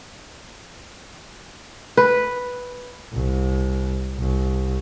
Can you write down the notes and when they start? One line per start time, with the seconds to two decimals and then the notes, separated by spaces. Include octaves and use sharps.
1.97 B4
3.13 C2
4.18 C2